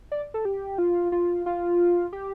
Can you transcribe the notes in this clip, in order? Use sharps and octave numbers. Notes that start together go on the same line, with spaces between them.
D5
A4
G4
F4
F4
F4
G4